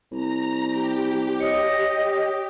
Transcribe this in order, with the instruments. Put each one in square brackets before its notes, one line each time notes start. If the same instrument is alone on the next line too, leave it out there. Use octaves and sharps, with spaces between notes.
[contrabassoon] C2 [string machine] A#5
[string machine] G4
[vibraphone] C#5 D#6 [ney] D#5